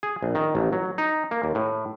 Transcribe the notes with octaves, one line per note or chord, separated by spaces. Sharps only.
G#4
A#1
D#3
A1
F#3
D#4
A#3
D#2
A2